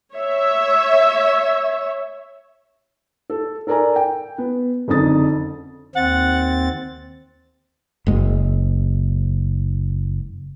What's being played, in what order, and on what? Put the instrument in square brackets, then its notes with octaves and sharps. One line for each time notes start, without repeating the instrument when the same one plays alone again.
[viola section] C#5 E5
[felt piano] A4
A4 A#4 D5 G#5 A#5
G5
B3
F#1 F2 D3 D#4 D#6 A6
[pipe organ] D#2 C4 A6 [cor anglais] F#5
[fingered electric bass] F#1 G#3